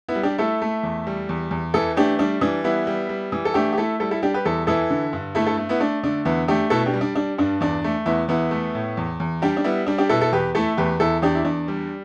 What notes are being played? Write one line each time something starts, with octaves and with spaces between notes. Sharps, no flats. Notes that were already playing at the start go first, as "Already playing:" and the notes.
B3 E4
G3
D4 G4
A3 E4 A4
A3
E2
G3
E2
E2
E3 E4 A4
A3 D4 G4
G3 D4
E3 D4
G3 B3 E4
G3
G3
E3
A4
A3 D4 G4
G4
A3 E4 A4
G3 E4 A4
E4 A4
G3 D4 G4
G4 B4
E2 E4 A4
E3 E4 A4
D3
G2
A3 E4 A4
E4 A4
A3
B3 E4
A3 D4
D3 D4
E2 B3 E4
A3 D4 G4
B2 E4 A4
D4 G4
G3
D4
G3 D4
G2 D4
E2 D4
A3
E2 B3 E4
E2 B3 E4
A3
A2
E2
E2
G3 D4 G4
D4
G3 B3 E4
G3 D4
D4 G4
B2 E4 A4
E4 A4
E2 G4 B4
A3 E4 A4
E2 G4 B4
E2 E4 A4
E2 D4 G4
E4
E2 D4
G3